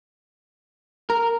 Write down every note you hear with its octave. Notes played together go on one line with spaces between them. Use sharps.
A#4